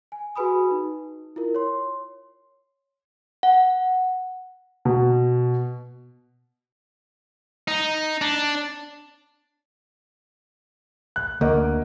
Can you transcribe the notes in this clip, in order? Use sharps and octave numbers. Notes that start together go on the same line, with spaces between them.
G#5
F#4 G#4 B4 G#5 B5 D#6
D#4
E4 F4 A#4
C#5 C6
F#5
B2
D#4
D4
F#6
D2 A#3 A#4 D#5